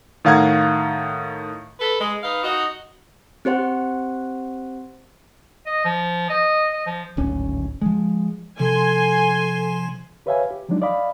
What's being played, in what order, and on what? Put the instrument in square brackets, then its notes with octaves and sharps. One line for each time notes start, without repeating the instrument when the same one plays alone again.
[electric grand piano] A2 D#3 F5 F#5 A#5 G#6
[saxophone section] A4 B4
G#3
D#4 B4 F5
D#4 F#4
[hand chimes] C4 G4 C5 F#5
[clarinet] D#5
F3
D#5
D#5
F3
[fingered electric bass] D1 G#1 C#4
F3 G#3
[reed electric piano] C3 [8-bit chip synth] F3 [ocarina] A4 [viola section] G#5 C6
[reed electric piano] G4 B4 C#5 E5 F5 G#5
G4
F3 F#3 G#3 D4 D#4
D5 D#5 F5 B5